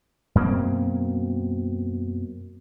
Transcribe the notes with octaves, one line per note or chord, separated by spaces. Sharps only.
F#2 B2 A#3 C4